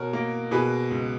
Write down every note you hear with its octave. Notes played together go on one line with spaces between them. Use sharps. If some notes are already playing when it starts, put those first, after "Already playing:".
Already playing: B2 A#4 C#5
A#3
B2 G#4 B4
C#2